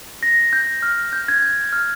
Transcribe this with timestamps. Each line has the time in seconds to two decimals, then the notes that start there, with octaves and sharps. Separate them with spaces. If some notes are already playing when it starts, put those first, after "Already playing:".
0.23 A#6
0.53 G6
0.83 F6
1.13 G6
1.28 G#6
1.42 G6
1.73 F6